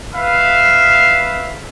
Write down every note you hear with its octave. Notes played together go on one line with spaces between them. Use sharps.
B4 E5 F5